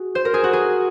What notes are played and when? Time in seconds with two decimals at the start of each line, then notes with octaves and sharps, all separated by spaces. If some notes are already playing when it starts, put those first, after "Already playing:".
Already playing: F#4 G#4
0.15 C5
0.25 A#4
0.34 G#4
0.44 F#4
0.53 G#4